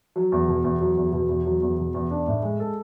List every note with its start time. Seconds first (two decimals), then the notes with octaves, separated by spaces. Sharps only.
0.16 F#3
0.32 E2
0.48 B2
0.64 E2
0.81 F#3
0.97 E2
1.12 B2
1.29 E2
1.45 F#3
1.62 E2
1.78 B2
1.94 E2
2.10 D4
2.27 A2
2.43 G#3
2.60 A4